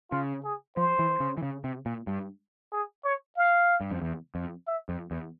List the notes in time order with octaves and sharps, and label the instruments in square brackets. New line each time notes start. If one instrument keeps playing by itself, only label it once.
[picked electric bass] C#3 [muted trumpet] F4
[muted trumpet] G#4
[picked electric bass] F3 [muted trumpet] C5
[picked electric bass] E3
C#3
E3
C#3
C3
A#2
G2
[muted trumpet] G#4
C#5
F5
[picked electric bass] G2
F2
E2
F2
[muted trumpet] E5
[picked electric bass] F2
E2